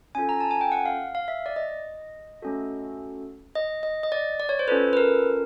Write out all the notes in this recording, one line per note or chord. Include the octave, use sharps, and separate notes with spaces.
C#4 F4 A4 G#5
A#5
A5
G#5
G5
F#5
F5
F5
E5
D5
D#5
A3 C#4 F#4 A4
D#5
D#5
D#5
D5
D5
C#5
C5
C#4 F4 A4 B4
B4
A#4